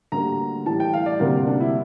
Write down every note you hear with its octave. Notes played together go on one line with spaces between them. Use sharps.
D2 D3 G3 A#3 A#5
A2 E3 G3 A5
G5
F5
D5
D2 C3 G3 A#3 A#4
D4
E4